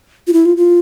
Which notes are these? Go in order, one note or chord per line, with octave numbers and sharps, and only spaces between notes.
F4
E4
F4
F4